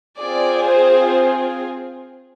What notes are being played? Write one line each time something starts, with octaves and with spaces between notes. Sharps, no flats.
C4 F4 G#4 D5
C5